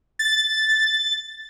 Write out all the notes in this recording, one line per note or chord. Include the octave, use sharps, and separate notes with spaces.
A6